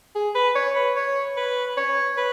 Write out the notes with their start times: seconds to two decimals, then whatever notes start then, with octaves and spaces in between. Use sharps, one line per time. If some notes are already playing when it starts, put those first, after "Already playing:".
0.15 G#4
0.35 B4
0.56 C#5
0.76 B4
0.96 C#5
1.37 B4
1.77 C#5
2.17 B4